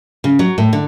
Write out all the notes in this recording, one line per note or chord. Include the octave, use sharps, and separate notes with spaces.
C#3
F#3
A2
D3